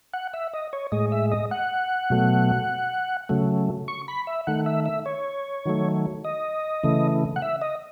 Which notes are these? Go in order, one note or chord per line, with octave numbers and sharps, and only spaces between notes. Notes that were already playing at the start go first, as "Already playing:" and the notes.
F#5
E5
D#5
C#5
A2 G#3 D#5
E5
D#5
F#5
B2 F#3 A3
C#3 F#3 A3
C#6
B5
E5
D#3 A3 F#5
E5
E5
C#5
D#3 F#3 A3
D#5
C#3 E3 A3
F#5
E5
D#5